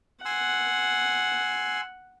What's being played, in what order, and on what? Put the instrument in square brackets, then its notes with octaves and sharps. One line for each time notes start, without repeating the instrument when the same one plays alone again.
[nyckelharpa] F#5 [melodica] G#5 C6 E6